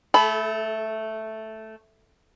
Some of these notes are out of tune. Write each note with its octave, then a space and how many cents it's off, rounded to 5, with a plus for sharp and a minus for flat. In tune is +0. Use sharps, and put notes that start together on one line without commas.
A3 +0 A4 -35 B5 +10